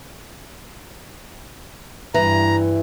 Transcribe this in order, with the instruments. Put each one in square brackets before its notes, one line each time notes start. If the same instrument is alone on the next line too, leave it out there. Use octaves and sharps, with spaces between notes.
[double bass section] G2 [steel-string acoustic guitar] E3 [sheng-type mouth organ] A#5